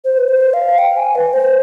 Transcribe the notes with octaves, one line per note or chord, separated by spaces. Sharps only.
C5
B4
C5
F5
G5
G#5
B4
C5